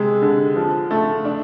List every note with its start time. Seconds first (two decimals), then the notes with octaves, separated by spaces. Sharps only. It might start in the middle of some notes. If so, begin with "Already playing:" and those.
Already playing: C3 G#3
0.22 D3
0.56 F3
0.91 A3
1.25 D4